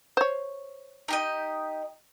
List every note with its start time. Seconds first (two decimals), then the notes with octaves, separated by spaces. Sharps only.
0.17 C5 C#5
1.08 D#4 G4 D#5